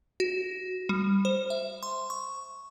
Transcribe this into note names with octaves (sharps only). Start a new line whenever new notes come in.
F#4
G3
C5
E5
C6
C#6